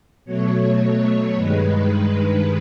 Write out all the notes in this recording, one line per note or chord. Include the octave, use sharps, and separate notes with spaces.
B2 F#3 A3 C#5
C#5
G2 D#3 G#3 B4